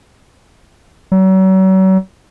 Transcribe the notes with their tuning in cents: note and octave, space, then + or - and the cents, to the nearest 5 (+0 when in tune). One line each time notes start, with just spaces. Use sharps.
F#3 +40